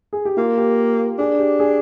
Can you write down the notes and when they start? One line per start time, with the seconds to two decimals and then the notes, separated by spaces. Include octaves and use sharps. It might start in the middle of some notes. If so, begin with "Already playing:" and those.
0.13 G#4
0.25 G4
0.37 A#3 F4
0.58 G4
1.18 D4 G#4
1.39 G4
1.59 G#4